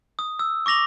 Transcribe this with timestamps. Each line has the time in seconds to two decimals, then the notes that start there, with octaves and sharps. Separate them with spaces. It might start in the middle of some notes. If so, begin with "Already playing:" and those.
0.19 D#6
0.39 D#6 E6
0.66 C#6 D6 A#6 F7 F#7